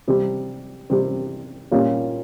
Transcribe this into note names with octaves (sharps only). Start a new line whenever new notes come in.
C3 G3 C4 G4
C3 G3 C4 G4
A#2 G3 C#4 F4